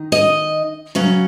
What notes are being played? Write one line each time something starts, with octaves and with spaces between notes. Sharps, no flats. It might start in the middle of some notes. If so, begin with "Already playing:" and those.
Already playing: D#3 D#4
D#5
C#3 F#3 C#4